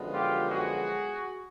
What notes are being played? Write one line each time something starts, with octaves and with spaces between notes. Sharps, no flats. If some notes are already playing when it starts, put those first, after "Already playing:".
Already playing: F#2 D3 F3 G#3 B3
F4 G4
F#4 G#4